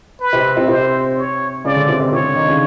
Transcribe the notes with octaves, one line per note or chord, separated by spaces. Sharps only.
B4
C3 C4
C3 C4
C3 C4 C5
C#5
C#3 C#4 D5
D3 D4
C3 C4
C3 C4
C3 C4 C#5
D3 D4
D#3 D#4
C#3 C#4